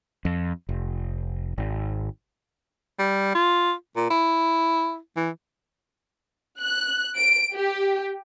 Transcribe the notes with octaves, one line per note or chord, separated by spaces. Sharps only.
F2
F1
G#1
G3
F4
A#2
E4
E3
F#6
D7
G4